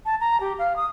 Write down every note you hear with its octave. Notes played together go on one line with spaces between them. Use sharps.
A5
A#5
G4
F5
D#6